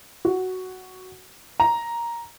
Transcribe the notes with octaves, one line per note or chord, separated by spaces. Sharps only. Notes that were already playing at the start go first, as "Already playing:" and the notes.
F#4
A#5